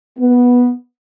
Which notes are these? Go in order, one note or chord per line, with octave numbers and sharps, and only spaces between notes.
B3